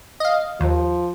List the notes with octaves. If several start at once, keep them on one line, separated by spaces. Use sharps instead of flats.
D#5 F5
D#2 F3